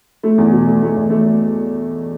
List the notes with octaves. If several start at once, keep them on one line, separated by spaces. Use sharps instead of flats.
A3
E2
B2
A3
A3
E2
A3